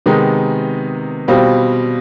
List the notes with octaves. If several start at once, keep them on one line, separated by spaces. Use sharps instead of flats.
C3 D#3 G#3 B3 D#4
B2 G3 C4 F4